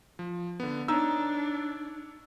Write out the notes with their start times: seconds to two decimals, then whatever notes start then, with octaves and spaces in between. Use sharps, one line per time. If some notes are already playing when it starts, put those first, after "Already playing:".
0.19 F3
0.60 D3 B3
0.88 D4 D#4 C#5 E6